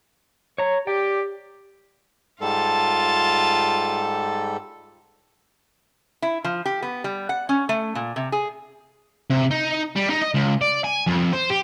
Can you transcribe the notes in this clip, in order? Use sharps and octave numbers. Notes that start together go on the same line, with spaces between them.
C#5 A#5
G4 D5 G5
G#2 G3 F4 A4 A5
E4
F3
G4
B3
G3
F#5
C#4
A3
A#2
C3
G#4
C3
D#4
G3
D#4
D#5
C#2
D5
G#5
F2
C5
G4